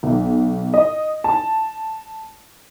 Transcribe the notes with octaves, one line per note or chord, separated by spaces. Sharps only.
B1
D#5
A5